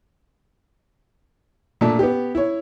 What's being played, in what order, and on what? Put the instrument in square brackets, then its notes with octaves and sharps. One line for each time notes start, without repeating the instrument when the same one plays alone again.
[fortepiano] A#2 A3 D4 A5
B3 G4
E4 C#5